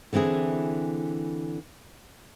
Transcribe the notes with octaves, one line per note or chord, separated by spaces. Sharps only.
D3 E3 C4 E4 G#4